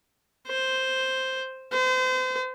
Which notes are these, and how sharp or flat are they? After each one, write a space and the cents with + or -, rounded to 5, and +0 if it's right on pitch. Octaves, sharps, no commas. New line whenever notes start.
C5 +0
C5 -35